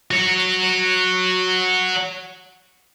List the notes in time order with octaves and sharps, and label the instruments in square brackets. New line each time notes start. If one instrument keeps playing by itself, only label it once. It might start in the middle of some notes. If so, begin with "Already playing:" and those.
[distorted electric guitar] F#4 C#5